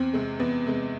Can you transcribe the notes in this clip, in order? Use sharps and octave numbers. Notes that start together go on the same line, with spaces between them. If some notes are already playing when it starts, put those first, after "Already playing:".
Already playing: E2 C4
C3 G#3
E2 B3
C3 G#3